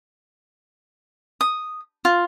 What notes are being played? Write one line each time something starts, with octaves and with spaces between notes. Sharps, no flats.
D#6
F4